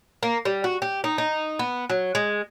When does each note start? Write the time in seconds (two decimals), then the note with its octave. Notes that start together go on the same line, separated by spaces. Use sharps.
0.23 A#3
0.45 G3
0.64 F#4
0.82 G4
1.04 D#4
1.18 D#4
1.59 B3
1.90 F#3
2.15 G#3